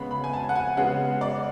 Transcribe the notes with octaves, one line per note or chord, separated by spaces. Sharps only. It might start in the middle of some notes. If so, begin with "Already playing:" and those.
Already playing: C#3 G#3 B3 B5
B5
G#5
A5
F#5
G#5
C#3 G#3 B3 F#5
D5